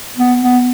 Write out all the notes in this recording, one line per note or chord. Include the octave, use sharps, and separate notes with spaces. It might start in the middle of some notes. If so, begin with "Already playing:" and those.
B3
B3